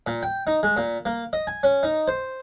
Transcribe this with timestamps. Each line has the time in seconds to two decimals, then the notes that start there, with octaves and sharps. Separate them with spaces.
0.07 A#2
0.23 G5
0.47 D#4
0.63 G#3
0.77 A#2
1.05 A#3
1.33 D#5
1.47 G#5
1.63 C#4
1.83 D#4
2.08 C5